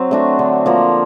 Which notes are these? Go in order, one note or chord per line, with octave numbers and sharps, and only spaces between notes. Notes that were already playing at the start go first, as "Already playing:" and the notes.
Already playing: F#3 C4
A3 D4 F#4
D3
F3 A#3